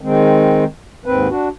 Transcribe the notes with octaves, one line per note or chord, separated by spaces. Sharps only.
D#3 G#3 C4
D#2 G#2 C4 B4
D4 F#4